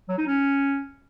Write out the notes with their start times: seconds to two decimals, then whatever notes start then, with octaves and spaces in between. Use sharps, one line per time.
0.09 F#3
0.18 D#4
0.27 C#4